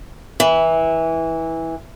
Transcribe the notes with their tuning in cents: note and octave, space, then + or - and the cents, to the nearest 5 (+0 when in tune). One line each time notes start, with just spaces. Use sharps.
E3 -15